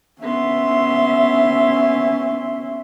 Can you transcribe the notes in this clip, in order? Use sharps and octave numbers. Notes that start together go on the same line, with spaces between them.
B3 C#4 E5 C6